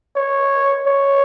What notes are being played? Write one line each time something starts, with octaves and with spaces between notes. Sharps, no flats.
C#5
C#5